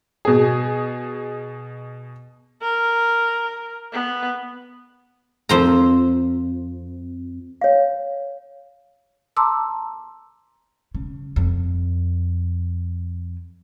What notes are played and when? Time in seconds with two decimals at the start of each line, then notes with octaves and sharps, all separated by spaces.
0.25 B2 G#4
2.62 A#4
3.92 B3
5.49 F2 C5 A#5
7.61 C#5 F5
9.37 A5 A#5 C6 D6 E6
10.95 C#3
11.36 F2